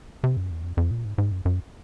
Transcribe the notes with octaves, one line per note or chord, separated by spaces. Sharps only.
C3
F#2
E2
F2
F2
A#2
G#2
G#2
F#2
F#2